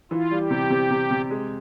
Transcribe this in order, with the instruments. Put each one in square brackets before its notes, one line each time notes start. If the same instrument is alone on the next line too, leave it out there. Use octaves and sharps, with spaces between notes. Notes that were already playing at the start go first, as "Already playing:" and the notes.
[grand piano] E3 [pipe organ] F4
[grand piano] G3
[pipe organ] G4
[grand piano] C3
C3
C3
C3
G#3